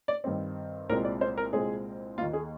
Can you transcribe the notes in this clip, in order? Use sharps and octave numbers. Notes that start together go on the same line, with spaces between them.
D5
G2 D#3 G3 C4
C2 A#2 G#3 C4 A#4
D5
C5
A#4
C2 A#2 G#3 C4 G#4
D#2 D#3 A#3 F4
G#4